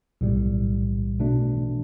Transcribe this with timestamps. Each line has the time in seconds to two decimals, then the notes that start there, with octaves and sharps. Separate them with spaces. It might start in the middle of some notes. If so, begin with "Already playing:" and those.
0.21 B1 A2 G3
1.20 B2 A3 D4